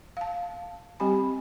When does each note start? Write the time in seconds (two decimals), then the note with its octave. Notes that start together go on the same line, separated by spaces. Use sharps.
0.17 F5 A5
1.00 G3 C4 G4 G#5 B5